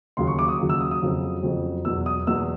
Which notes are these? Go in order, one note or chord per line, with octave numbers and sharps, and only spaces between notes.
D#2 C#3 F#3 C6
C#6
D6
D#6
D#2 C#3 F#3
E6
D#6
D#6
F2 C#3 F#3
F2 C#3 F#3
E2 B2 F#3 E6
D#6
E2 B2 F#3 E6